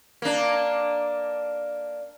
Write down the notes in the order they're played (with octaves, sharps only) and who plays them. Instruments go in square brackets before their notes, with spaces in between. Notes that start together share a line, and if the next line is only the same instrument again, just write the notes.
[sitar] A#3 D4